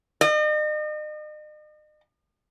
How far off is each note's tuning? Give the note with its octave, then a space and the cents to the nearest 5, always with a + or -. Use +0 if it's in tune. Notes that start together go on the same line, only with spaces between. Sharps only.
D#5 -40